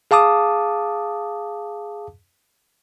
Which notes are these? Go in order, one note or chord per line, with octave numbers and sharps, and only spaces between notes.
G#4 F5 A5 D6 D#6